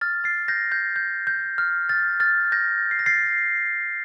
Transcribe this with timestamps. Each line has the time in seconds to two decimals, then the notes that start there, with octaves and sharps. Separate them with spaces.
0.01 F6 A6
0.24 A6 C7
0.48 G6 A#6
0.71 G6 A#6
0.96 G6
1.27 G6
1.58 F6
1.89 F6 A6
2.20 F6 A6
2.52 G6 A#6
2.91 C7
2.99 A#6
3.06 A6 C7